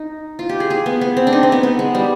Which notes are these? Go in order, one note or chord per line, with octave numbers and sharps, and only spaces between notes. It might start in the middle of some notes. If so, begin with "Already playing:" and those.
Already playing: D#4
F4
G4
G#4
G#4
B3
B3
C4
D4
D#4
C4
B3
B3
G#3
G3